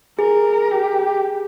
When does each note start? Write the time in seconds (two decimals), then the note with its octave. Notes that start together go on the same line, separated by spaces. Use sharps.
0.19 G#4 A#4
0.71 G4